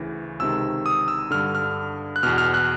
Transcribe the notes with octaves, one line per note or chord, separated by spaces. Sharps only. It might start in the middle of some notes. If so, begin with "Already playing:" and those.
Already playing: D2 C#3 E3
C#2 C3 D#3 E6
D#6
E6
G2 D3 F6
F6
F#6
E2 B2 F6
F6
F#6